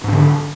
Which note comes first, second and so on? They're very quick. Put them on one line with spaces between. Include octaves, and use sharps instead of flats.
G#2 D4 D3